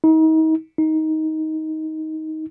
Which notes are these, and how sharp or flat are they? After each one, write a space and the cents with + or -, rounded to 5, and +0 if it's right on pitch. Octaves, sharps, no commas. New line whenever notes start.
D#4 +35
D#4 +15